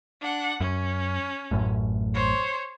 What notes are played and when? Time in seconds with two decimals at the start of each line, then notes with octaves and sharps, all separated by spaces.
0.21 D4 F#5
0.60 F#2 C#4
1.51 A1 F#2 A2
2.15 C5 C#5